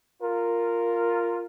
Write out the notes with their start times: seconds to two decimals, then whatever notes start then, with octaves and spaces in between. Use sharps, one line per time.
0.22 F4 A#4